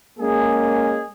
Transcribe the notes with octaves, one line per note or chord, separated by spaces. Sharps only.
G#3 A#3 C#4 G#4